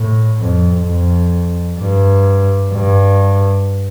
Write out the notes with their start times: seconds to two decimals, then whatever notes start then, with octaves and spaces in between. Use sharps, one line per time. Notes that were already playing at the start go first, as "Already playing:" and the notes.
Already playing: A2
0.39 F2
0.85 F2
1.78 G2
2.72 G2